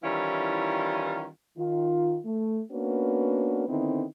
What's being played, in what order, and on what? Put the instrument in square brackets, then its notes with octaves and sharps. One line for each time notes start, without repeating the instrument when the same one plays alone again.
[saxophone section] D#3 E3 G3 C#4 E4 F4
[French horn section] D#3 F4
A3
A#3 B3 C#4 D4 F#4 B4
D3 D#3 B3 C4 D#4 E4